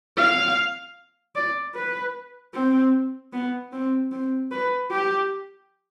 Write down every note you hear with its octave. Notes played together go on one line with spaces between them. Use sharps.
F5
D5
B4
C4
B3
C4
C4
B4
G4